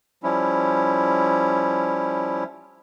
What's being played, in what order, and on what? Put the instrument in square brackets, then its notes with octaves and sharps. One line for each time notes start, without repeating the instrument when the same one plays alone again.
[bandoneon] F3 G3 C#4 E4